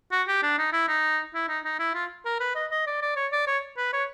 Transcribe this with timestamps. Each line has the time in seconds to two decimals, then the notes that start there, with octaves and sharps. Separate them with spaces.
0.12 F#4
0.28 G4
0.42 D4
0.58 D#4
0.73 E4
0.88 D#4
1.34 E4
1.49 D#4
1.65 D#4
1.79 E4
1.94 F4
2.25 A#4
2.40 B4
2.55 D#5
2.71 D#5
2.87 D5
3.02 D5
3.16 C#5
3.32 D5
3.47 C#5
3.77 B4
3.93 C#5